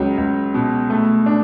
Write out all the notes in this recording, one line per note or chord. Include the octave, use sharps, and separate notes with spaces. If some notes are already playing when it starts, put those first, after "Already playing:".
Already playing: C#2 F#3
C#2
B2
A3
D4